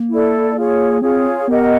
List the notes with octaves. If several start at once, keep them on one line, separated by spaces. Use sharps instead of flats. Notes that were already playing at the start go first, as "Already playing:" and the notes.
Already playing: A#3
E4 A4 D5
F4 G#4 C#5
C4 F4 G#4 C#5
B3 G4 A#4 D#5 F#5